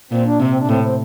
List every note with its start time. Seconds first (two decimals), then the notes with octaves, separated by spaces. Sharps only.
0.11 A#2 C4
0.25 D4
0.39 C3 C4
0.50 C4
0.59 D4
0.69 A2 C4
0.83 C4